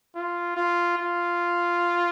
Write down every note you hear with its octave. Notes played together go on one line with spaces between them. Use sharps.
F4
F4
F4